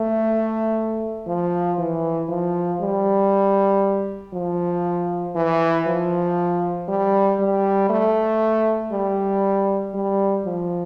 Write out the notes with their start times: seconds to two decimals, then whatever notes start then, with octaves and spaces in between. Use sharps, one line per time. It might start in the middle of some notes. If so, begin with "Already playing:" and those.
Already playing: A3
1.27 F3
1.78 E3
2.29 F3
2.81 G3
4.33 F3
5.35 E3
5.87 F3
6.88 G3
7.39 G3
7.90 A3
8.92 G3
9.94 G3
10.46 F3